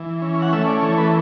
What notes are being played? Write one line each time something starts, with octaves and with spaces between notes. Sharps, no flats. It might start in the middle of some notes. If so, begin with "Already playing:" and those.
Already playing: E3
C#4
F#5
A3 E5
D5
E3 C#5
B4